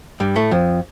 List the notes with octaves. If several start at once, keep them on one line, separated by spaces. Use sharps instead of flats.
G2 G3
A2 A3
F2 F3